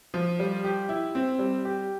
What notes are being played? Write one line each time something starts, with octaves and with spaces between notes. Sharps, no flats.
F3
G3
G4
E4
C4
G3
G4